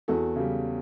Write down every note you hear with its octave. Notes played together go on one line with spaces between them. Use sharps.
E2 F#4 A4
C#3 G3